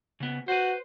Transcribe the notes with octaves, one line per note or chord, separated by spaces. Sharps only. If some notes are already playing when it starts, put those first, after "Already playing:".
C#3 B3
F#4 B4 C5